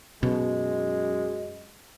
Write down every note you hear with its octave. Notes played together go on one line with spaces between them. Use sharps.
F#2 B2 G#3